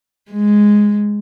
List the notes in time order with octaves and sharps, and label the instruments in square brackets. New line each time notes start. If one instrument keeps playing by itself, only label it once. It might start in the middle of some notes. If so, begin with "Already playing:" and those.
[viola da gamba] G#3